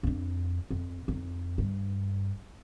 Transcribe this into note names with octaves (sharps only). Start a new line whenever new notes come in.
F2 D4
F2
F2 D#4
G2